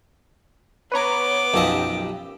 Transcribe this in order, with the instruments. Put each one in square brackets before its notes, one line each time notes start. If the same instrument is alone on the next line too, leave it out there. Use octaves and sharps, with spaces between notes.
[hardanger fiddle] B3 D6 [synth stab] B4 C#5 A#5
[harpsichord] B1 F3 D#5 [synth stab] F#2 G4 E6